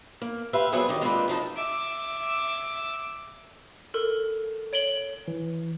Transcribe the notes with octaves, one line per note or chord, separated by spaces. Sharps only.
A#3
G4 B4 C5 E5 F5
E2 F#3 G3 B3 G#4 C5
D#3 G4 D#5
G#3 A#3 C4 D4 F4 B4
F#2 F3 D#4 A5
E5 D6
A4 A#4
C#5 D7 F#7 G7
E3